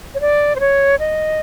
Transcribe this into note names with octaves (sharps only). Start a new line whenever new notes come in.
C#5
D5
C5
C#5
D#5